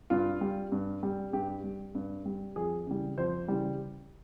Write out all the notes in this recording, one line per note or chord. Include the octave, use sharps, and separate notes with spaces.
G2 F4
G3
G2
G3
G2 G4
G3
G2
G3
F2 G#4
C#3 E3 G3
F2 C5
C#3 E3 G3